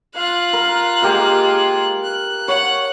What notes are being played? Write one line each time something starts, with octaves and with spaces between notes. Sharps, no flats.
F4 F5 F#6
A#4
G#3 A#3 G4 A#4 F5
F#6
C#5 F#5